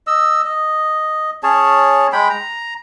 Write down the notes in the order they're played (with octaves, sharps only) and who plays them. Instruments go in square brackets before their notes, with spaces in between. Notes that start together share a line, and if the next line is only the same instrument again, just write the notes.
[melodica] D#5 E6
D#5
C#4 G#4 C#5 A5
G#3 G5 B5
A#5